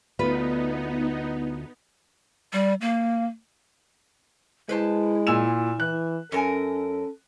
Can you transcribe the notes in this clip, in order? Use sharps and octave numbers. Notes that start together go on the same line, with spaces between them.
D2 B3 D#4 F4 B4
G3
A#3
G#3 E4 B4 C5 A5
A#2 G#5 E6 E7
E3 F#6
F#2 C#4 A4 A#4 G#5